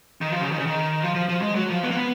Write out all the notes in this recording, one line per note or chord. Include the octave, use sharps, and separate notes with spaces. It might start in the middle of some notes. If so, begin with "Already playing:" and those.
D#3
F3
C#3
D#3
C#3
D#3
F3
F3
F3
G#3
F#3
F3
B3
A#3
B3